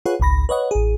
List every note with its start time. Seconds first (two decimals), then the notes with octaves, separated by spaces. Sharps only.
0.06 F4 G#4 B4 C#5 F#5
0.20 G#1 C#2 B5 A#6
0.49 B4 C#5 D#5 F#5
0.71 A1 G#4